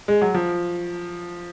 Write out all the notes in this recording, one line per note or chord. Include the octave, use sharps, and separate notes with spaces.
G#3
F#3
F3